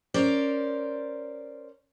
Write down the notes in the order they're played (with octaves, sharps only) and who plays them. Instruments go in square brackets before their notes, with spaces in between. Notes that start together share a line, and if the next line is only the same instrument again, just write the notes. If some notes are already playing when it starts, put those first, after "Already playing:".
[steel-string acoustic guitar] C#4 A#4 C5 D5